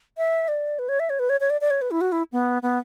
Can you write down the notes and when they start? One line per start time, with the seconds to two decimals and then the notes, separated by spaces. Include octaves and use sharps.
0.18 E5
0.48 D5
0.79 B4
0.89 C#5
1.00 E5
1.10 C#5
1.19 B4
1.30 C#5
1.41 C#5
1.50 D5
1.61 D5
1.70 C#5
1.82 B4
1.91 E4
2.01 F#4
2.12 E4
2.32 B3
2.62 B3